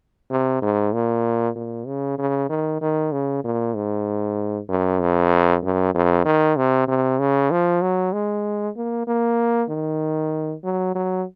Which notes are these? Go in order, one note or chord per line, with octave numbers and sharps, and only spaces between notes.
C3
G#2
A#2
A#2
C#3
C#3
D#3
D#3
C#3
A#2
G#2
F#2
F2
F#2
F2
D#3
C3
C3
C#3
F3
F#3
G#3
A#3
A#3
D#3
F#3
F#3